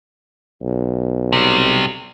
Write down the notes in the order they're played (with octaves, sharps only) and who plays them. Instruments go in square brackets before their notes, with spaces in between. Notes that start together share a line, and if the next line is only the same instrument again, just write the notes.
[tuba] B1
[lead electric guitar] C3 G3